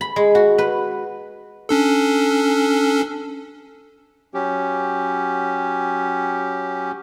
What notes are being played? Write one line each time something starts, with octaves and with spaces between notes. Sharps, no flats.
B5
G#3
F#4
B4
C#4 D4 A4
F#3 C#4 G4